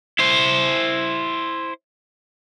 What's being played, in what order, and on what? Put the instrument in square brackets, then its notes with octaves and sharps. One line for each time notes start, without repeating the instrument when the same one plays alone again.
[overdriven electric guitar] E4 C5